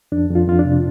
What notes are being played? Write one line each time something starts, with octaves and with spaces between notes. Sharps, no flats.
F2 D4
F2
F4
F2 F4
D4
C3